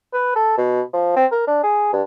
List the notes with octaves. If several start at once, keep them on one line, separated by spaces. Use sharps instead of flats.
B4
A4
B2
F3
C4
A#4
D4
G#4
G2